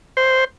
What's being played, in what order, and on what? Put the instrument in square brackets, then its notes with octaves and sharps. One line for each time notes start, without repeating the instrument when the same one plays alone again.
[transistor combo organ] C5